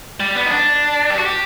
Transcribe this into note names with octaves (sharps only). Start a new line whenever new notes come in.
G3
B3
D#4
D4
G4
F#4
G4